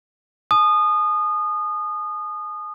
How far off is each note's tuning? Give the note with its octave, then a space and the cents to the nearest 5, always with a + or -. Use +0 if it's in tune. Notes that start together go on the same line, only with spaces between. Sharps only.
G#5 +45 D#6 -25